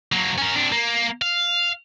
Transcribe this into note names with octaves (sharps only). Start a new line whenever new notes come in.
F#3 A#3
C#4 A#4
C3 D4
A#3
F5